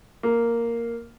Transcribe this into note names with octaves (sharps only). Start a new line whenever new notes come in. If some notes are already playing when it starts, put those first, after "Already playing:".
A#3